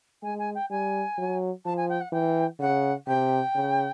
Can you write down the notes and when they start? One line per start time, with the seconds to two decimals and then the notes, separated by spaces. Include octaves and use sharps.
0.23 G#3 G#5
0.39 G#5
0.55 G5
0.70 G3 G#5
1.18 F#3
1.65 F3 A5
1.77 G#5
1.89 G5
2.00 F#5
2.12 E3 G5
2.60 C#3 F#5
3.07 C3 G5
3.55 C#3